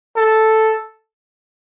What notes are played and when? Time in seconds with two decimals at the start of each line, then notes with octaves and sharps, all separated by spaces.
0.17 A4